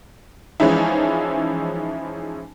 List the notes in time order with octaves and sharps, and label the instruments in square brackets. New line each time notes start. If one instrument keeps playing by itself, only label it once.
[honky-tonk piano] E3 F3 G#3 C#4 D#4 E4